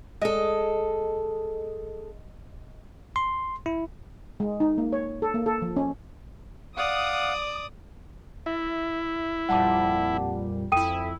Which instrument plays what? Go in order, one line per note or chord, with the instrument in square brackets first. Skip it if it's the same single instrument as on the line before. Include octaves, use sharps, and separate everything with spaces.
[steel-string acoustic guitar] G#3 A4 [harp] D#5
[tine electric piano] C6
E4
[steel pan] G#3
D#4
A#3
C#5
A4
A#3
A4
F3
C#4
[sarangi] D5 [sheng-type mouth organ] F5 F#5 [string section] D#6
[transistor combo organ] E4 [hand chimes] E5
[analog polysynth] F2 A#2 G3 [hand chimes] F#5 A5 D6
[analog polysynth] F2 E4 [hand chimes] A4 [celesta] G5 D#6 D#7